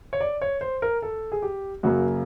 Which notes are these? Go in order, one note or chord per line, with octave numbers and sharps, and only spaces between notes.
C#5
D5
C#5
C5
A#4
A4
G#4
G4
F#2 C#3 F#3 A#3 F#4